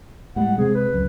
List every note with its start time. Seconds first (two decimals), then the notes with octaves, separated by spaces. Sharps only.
0.36 A2 G3 G#3 F#5
0.58 C3 G#3 C4 G#4
0.75 B4
0.92 C#2 F#2